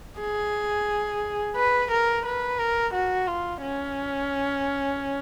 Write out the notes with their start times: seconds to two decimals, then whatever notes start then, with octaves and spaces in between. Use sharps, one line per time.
0.20 G#4
1.56 B4
1.91 A#4
2.25 B4
2.59 A#4
2.93 F#4
3.27 F4
3.62 C#4